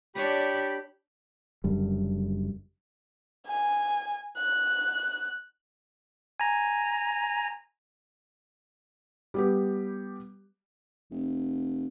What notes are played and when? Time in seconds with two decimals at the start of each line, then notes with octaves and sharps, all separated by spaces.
0.15 D4 G4 C#5 D5 B5
1.64 F#1 F#2 D3 G3
3.47 G#5
4.37 F#6
6.40 G#5 A#5
9.34 G3 B3 G4
11.11 F1